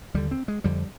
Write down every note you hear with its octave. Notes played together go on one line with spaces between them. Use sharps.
D#2 D3 G3
C4
G#3
F2 D3 G3